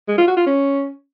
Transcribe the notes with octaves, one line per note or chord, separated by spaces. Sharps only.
G#3
F4
F#4
F4
C#4